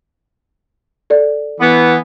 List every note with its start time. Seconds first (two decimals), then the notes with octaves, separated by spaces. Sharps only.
1.10 A4 D5
1.61 E3 B3